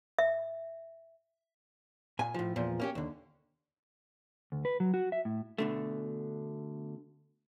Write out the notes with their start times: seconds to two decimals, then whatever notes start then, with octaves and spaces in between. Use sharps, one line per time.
0.19 E5
2.19 A#2 G#5
2.34 A2 F3
2.56 E2 A#2 F3
2.80 A#3 C#4 G4
2.95 D#2 D3
4.52 D2
4.65 B4
4.80 F#3
4.94 F#4
5.12 E5
5.25 A2
5.58 B2 D3 A3